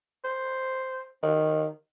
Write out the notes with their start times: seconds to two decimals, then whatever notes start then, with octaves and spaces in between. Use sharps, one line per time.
0.24 C5
1.23 D#3